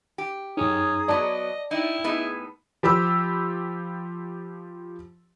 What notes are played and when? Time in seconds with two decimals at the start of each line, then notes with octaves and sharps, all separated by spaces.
0.18 G4
0.57 F#2 C#4 D#4 G#4 A#5 D#6
1.08 F#3 B3 D5 D#5 A5
1.71 D#4 E4 G5
2.04 A2 B3 D#4 G#4
2.83 F3 G4 B5 E6